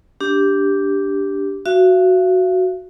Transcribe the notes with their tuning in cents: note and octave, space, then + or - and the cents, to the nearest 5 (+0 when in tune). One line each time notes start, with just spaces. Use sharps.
D4 -10 G4 +0
F#4 +0 F5 -45